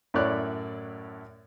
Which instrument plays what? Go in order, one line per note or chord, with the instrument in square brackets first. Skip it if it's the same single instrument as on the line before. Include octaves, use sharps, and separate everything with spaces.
[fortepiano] F#2 A2 E4 C#5 D5 F#6